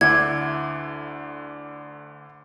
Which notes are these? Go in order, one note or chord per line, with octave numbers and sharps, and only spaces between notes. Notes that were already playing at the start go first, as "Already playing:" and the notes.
D2 D3 E4 D5 F#5 G#6